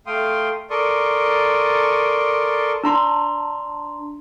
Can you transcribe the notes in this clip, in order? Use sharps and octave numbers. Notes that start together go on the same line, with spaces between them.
A3 F5 G5 C6 D#6
A4 A#4 D5 C6 C#6 D#6
D4 A#5 C6